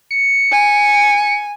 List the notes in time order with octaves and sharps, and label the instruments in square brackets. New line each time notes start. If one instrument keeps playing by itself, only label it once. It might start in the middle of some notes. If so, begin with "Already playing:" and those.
[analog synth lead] C#7
[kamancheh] G#5